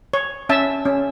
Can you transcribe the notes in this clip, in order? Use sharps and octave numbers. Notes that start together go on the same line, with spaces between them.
C#5
C#4 E5 A5
C#4